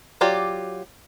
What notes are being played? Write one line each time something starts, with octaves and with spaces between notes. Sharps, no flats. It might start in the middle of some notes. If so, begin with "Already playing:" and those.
F#3 F4 G4 D5